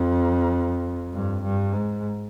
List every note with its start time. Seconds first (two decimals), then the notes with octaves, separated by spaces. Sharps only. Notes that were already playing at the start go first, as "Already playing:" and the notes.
Already playing: F2
1.14 G2
1.43 G2
1.72 G#2